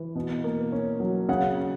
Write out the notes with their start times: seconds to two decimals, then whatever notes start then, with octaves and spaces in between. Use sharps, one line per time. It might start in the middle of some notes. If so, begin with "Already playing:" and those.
Already playing: E3
0.15 B2
0.44 A#3
0.72 C#4
1.00 F#3
1.29 C#3 F#5